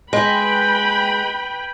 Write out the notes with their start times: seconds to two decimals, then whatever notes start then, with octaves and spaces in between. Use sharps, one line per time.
0.13 G#3 B4 G5 B5